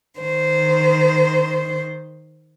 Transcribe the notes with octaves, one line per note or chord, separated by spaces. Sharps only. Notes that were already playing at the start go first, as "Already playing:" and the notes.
D#3 C5